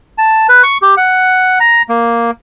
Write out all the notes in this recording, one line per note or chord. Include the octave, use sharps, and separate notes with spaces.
A5
B4
C#6
G4
F#5
A#5
A#3